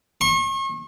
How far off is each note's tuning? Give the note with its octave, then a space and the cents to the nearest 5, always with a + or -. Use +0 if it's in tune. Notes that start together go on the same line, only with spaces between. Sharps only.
C#6 -40